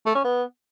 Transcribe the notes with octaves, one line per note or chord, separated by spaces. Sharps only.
A3
C#4
B3